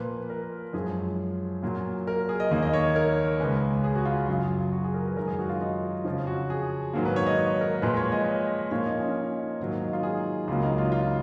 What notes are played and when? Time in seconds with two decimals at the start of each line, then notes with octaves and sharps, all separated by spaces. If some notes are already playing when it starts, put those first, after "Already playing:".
Already playing: A#2 F3 A#3 B4
0.30 A#4
0.73 F#2 F3 G#3 G#4
1.63 A#2 F#3 A#3
2.07 A#4
2.29 G#4
2.40 D#5
2.51 D#2 D#3 A#3 D#5
2.62 D#5
2.73 C#5
2.96 A#4
3.40 C#2 C#3 G#3 B4
3.84 G#4
3.95 F#4
4.05 F4
4.28 F#2 C#3 F#3 F4
4.72 F#4
4.84 G#4
4.94 A#4
5.06 B4
5.17 F#2 D#3 G#3 A#4
5.27 G#4
5.39 F#4
5.49 F4
5.61 D#4
6.05 F2 C#3 F3
6.27 F#4
6.50 G#4
6.93 G#2 D#3 F#3 A#3
7.05 B4
7.16 C#5
7.26 D#5
7.39 C#5
7.61 A#4
7.82 A#2 F3 G#3 B4
7.97 C#5
8.12 D#5
8.71 A#2 F3 A#3 C#5
8.86 D#4
9.01 C#4
9.15 D#4
9.60 G#2 D#3 F#3 A#3
9.71 D#4
9.82 D#4
9.93 F4
10.03 G#4
10.47 C#2 C#3 F#3 A#3 F4
10.63 D#4
10.78 F4
10.92 F4